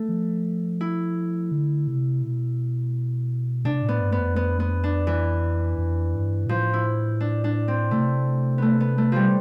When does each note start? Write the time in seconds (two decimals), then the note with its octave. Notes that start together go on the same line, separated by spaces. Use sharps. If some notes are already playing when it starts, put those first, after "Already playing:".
Already playing: A3
0.09 F3
0.81 E4
1.52 D3
1.87 C3
2.22 B2
3.65 C3 D4
3.82 A2
3.89 B3
4.01 G2
4.12 B3
4.18 F2
4.36 B3
4.60 B3
4.84 D4
5.07 E3
5.78 F2
6.14 G2
6.46 B2
6.49 A2 F3
6.73 E4
7.20 D4
7.44 D4
7.68 C4
7.91 C3 A3
8.58 A3 B3
8.80 B3
8.98 A3
9.12 F3 G3